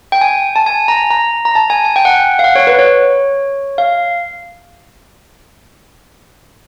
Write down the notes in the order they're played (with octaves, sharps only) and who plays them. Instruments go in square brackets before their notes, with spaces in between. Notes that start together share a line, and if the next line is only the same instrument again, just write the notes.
[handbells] G5
G#5
A5
G#5
A#5
A#5
A#5
A5
G#5
G#5
G5
F#5
G5
F5
F#5
C#5
B4
C#5
F5